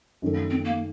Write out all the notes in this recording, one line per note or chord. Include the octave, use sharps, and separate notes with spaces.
F#2 D#3 A3
C4
A#3